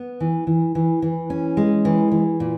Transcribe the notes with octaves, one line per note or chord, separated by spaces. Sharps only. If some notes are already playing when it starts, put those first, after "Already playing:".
Already playing: B3
E3
E3
E3
E3
C#4
G#3
E3
E3
A#2